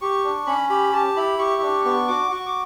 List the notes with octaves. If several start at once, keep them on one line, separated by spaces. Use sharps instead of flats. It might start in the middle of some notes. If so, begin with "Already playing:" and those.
G4 C#6
D4
C#4 B5
G4 B5
G4 A5
E4 B5
G4 C#6
D4
B3 C#6
F#4 D6
F#4 C#6
D6